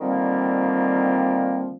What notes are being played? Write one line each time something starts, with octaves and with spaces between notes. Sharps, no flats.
D3 D#3 F3 G3 A#3 C4